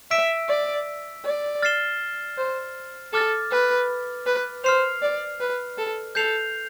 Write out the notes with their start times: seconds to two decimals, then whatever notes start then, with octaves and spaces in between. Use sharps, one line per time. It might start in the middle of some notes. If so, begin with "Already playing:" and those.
0.11 E5 E6 B6 D7
0.49 D5
1.25 D5
1.62 F6 A6 C7 E7 G7
2.38 C5
3.13 A4 D6 F6 A6
3.51 B4
4.26 B4
4.64 C5 F6 C7 F7
5.03 D5
5.40 B4
5.78 A4
6.15 A4 G6 C7 F7